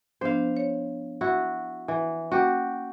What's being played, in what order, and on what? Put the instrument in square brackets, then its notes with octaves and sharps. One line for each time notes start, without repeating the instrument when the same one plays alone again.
[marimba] F3 B3 D4 [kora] C5 F5
[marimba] C#5
[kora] E4 F#4
E3
[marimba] A#3 C#4 [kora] F#4 G4